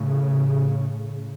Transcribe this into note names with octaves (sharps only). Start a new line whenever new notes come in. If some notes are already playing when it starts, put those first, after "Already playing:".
Already playing: A2 C#3